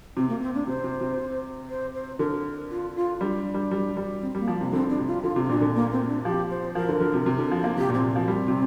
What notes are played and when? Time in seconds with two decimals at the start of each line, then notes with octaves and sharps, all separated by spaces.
0.17 C3 C4
0.29 A#3
0.42 C4
0.55 D4
0.67 C3 C5
0.84 C3
1.01 C3
1.69 C5
1.94 C5
2.19 D3 A#4
2.70 F4
2.96 F4
3.20 G3 D4
3.54 G3
3.71 G3
3.97 G3
4.22 C4
4.35 G3
4.40 A#3
4.48 F3
4.61 C3
4.73 D3 C4
4.89 D4
4.98 C3
5.07 F4
5.23 D3 F4
5.36 C3
5.44 C4
5.49 A#2 D4
5.61 D3
5.75 A#3
5.92 C4
6.08 D4
6.25 F3 G4
6.50 C5
6.75 F3 A#4
6.89 D3
7.01 D3
7.14 C3
7.26 C3
7.39 D3
7.52 F3
7.64 A#3
7.77 C3 G4
7.90 A#2
7.94 C4
8.02 C3
8.11 F3 C4
8.28 G3
8.48 C3